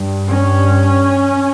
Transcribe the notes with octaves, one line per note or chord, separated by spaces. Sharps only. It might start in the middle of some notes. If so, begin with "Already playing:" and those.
Already playing: G2
C#4